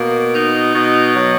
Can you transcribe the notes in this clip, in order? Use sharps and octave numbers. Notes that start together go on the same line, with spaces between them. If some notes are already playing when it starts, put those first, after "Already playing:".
Already playing: B2 A#3
D#4
B2
F#3